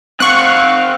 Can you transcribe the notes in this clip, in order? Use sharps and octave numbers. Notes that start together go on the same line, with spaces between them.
C4 F5 F#5 C#6 F#6